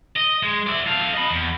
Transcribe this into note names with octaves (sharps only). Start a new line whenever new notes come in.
D#5
G#3
D5 E5
A4 F5
D#5 B5
E2